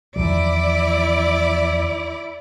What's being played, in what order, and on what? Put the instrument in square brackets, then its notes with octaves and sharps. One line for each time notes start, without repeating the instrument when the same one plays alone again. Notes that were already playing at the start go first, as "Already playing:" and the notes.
[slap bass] E2 D#3 F3 [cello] E4 D5